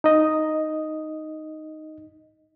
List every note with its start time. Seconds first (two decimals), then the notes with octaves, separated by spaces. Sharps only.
0.04 D#4 D#5